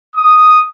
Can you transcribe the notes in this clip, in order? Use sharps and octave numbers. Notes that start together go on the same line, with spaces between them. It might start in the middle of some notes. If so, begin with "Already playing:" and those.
D#6